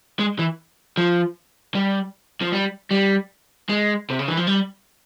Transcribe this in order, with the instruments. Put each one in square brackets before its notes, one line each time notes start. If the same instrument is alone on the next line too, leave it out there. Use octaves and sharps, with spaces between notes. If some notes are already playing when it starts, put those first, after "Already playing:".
[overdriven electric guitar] G#3
E3
F3
G3
F3
G3
G3
G#3
C3
C#3
E3
F3
G3